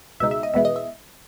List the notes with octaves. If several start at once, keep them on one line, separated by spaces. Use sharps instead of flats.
C#2 B2 G#3 D#4 E5
E5
D#5
E2 B2 G#3 B3 E4 E5
D#5
E5